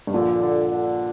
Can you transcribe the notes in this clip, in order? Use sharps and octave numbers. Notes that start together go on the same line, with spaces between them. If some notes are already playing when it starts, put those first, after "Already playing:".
G2
A#1 A#2 D3
D3
D3